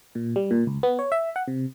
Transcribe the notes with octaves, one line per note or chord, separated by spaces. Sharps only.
A#2
G3
A#2
C#2
B3
C#5
E5
F#5
C3